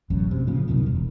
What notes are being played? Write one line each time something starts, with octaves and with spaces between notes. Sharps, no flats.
E1 A1 F#2
C3
A#2 C#3 F3
C2 F#2 B2 D#3
E1